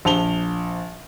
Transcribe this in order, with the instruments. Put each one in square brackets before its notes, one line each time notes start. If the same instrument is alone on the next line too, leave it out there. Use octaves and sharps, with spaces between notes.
[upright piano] A#1 A5 F7 G7